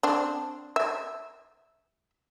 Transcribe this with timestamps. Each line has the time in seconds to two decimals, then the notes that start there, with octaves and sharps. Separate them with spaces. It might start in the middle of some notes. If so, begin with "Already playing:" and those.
0.03 C4 D4
0.76 E5